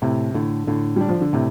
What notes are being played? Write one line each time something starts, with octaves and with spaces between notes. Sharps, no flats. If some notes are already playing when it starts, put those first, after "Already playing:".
A2 C3
A2 D3
A2 D3
G3 D4
F3
D3
A2 C3